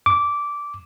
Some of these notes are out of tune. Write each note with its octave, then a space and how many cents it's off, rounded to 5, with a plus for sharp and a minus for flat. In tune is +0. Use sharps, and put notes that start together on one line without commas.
D6 -15